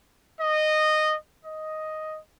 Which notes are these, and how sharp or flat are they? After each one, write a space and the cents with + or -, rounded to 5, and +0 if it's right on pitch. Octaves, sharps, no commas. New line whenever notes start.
D#5 -15
D#5 +5